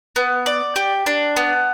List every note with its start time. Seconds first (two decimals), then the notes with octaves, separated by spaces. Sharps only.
0.16 B3
0.46 D5
0.76 G4
1.06 D4
1.37 B3